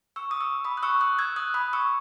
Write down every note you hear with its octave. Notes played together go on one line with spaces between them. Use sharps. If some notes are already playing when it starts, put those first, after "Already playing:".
C#6 E6
D#6
C#6 E6
B5 D#6
F#6
C#6 E6
D#6 F#6
E6 G#6
D#6 F#6
B5 D#6
C#6 E6